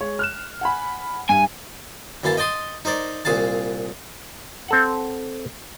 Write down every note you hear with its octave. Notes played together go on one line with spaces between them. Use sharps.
G#3 C#5
F6 F#6 E7
F#5 G#5 B5
G2 G#5
F#2 E3 A#3 F5 A5
D#5 G5 A5 C6 D#6
D#4 A#4 C5 D5
C2 A#2 G#4 F5 A5
C4 A4 F#5